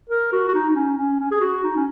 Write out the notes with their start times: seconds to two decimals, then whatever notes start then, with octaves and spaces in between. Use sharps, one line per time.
0.10 A#4
0.32 F#4
0.48 F#4
0.54 D#4
0.70 D#4
0.75 C#4
0.98 C#4
1.20 C#4
1.31 G#4
1.41 F#4
1.63 D#4
1.76 C#4